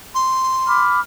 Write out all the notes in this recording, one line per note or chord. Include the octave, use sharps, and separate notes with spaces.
C6
B5 D6 F6